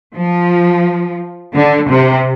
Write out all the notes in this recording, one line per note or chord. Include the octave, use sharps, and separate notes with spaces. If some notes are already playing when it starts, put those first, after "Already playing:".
F3
D3
C3